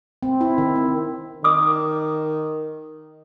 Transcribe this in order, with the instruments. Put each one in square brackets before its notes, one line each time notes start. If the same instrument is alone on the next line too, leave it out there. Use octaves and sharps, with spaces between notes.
[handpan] C4
E4
D#3
C4
[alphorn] D#3 [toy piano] D6 D#6